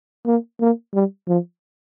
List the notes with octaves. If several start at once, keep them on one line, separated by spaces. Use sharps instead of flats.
A#3
A#3
G3
F3